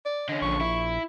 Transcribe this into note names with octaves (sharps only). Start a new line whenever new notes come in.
D5
D3 C#4 D#5
A#1 C#6
E4